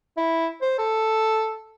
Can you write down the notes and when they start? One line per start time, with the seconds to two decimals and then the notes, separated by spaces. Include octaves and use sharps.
0.17 E4
0.62 C5
0.79 A4